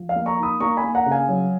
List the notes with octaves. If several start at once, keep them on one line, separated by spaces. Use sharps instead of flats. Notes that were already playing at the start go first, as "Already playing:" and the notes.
Already playing: F3
F5
A#3
A#5 C#6
D#4 B5 D#6
A#3 A#5 C#6
G#5 B5
A#3
F#5 A#5
C#3
F5 G#5
F#3